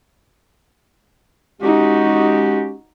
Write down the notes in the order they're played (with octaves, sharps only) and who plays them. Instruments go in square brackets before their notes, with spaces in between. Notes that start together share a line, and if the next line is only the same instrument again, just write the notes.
[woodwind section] G#3 C#4 G4 [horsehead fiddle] D#4 F#4